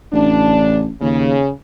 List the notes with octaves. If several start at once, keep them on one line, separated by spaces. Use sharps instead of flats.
A1 C#3 D4
D#2 C#3